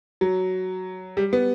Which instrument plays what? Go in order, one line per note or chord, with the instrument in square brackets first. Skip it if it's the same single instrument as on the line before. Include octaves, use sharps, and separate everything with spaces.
[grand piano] F#3
G3
B3